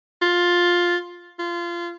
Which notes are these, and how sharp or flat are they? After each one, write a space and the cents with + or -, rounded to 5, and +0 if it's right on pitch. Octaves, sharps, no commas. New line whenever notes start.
F4 +10
F4 -20